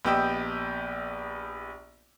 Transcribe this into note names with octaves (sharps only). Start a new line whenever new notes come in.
A#1 B3 G4 D#5 G5 E6